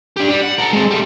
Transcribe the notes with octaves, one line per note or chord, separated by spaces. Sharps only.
D4 G4
G3
F#5
A4 A#4
G#3 C4
G3 A3